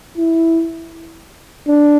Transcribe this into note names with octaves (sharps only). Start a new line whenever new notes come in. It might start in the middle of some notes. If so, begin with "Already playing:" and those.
E4
D4